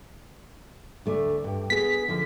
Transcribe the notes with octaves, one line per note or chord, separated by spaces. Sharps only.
D2 A3 D5
G2 G5
B3 G#4 B6
F#2 D3 F3